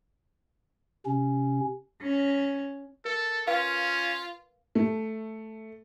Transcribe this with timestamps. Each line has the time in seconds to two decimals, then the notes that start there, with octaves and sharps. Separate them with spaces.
1.06 C3 C#4
2.02 C#4
3.05 A4 A#4
3.47 C#4 F4 B4 F5 C#6
4.75 A3